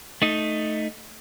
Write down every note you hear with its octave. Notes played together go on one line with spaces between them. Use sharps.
A3 D#4